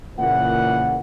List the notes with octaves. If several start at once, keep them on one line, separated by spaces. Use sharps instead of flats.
A#2 C#3 E3 F#5